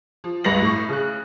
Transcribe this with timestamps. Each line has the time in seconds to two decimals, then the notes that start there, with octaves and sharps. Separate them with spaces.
0.24 F3
0.44 C#2 G2 B4 A#6 F#7
0.62 A2 C#6
0.89 C#3 F#6